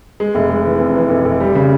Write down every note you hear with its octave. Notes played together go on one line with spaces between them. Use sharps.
G#3
F1
G#3
E3
F2
E3
F1
F1
G3
C#3